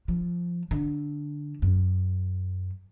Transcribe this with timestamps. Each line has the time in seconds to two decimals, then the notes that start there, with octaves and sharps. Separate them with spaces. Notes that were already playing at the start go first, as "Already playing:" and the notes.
0.08 F3
0.71 D3
1.62 F#2